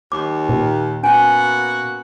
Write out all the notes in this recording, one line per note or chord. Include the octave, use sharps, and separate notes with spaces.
D#2 D6
A#2
A#3 B3 C#4 F#4 G#5